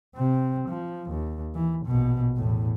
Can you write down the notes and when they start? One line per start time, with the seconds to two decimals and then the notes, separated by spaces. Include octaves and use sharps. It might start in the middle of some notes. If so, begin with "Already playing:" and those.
0.16 C3 C4
0.68 F3
1.10 D#2
1.55 E3
1.86 A#1 B2
2.36 E2 A2